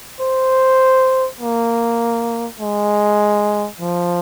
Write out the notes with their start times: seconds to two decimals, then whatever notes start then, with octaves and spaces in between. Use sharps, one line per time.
0.21 C5
1.40 A#3
2.60 G#3
3.80 F3